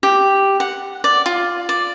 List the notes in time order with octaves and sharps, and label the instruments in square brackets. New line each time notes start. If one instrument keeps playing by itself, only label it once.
[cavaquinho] G4
F#5
D5
F4
D5